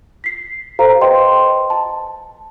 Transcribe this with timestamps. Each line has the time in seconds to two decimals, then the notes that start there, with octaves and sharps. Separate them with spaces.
0.24 B6 C7
0.79 G4 A4 C5 F5 A#5
1.01 B4 C5 D#5 G5 C6
1.70 A5